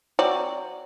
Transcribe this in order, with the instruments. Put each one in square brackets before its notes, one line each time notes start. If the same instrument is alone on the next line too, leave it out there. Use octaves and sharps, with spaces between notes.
[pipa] F#3 C4 F#4 D5